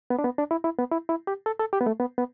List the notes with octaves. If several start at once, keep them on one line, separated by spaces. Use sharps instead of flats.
B3
D4
B3
D4
E4
E4
B3
E4
E4
G4
A4
A4
G4
B3
A3
B3
B3